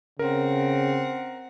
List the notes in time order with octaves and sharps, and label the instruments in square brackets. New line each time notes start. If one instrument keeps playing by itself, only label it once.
[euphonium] C#3 [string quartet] C4 F#5 [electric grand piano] A#4